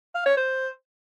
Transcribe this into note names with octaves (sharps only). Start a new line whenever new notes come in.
F5
C#5
C5